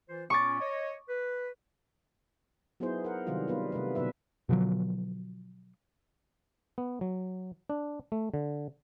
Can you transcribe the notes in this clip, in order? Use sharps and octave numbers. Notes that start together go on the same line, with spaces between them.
E3 F4 C5
A#2 B3 C#4 C#6 D6 A6
C#5 D#5
B4
F#3 B3 D#4 E4 G#4 C5
A#4 F#5
C3 D#3 F#3 G3 F4
G3 B3 D#4 F4 B4
C3 G3 A3 B4
B2 D3 F#3 B4 E5
B2 D3 F3 F#3
B3
F#3
D4
A3
D3